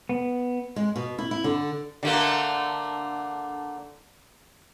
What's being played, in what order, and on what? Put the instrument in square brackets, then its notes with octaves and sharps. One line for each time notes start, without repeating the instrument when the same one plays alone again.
[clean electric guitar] B3
[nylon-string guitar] G#3
B2
E4
E4
D3
[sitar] D3 A3 A#3